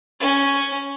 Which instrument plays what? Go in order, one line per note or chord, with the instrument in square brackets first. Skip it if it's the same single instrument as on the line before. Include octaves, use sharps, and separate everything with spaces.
[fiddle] C#4